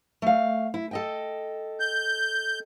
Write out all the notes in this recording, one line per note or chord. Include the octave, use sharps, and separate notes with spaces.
A3 F5
E4
A4 D#5 G5
G6